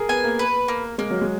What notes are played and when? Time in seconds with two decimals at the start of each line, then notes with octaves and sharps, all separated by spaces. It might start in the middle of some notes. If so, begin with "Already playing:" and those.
Already playing: G#4 A#4
0.09 B3 G#5
0.24 A#3
0.39 B4
0.68 A#3
0.98 G#3 A#3
1.10 F#3
1.21 G#3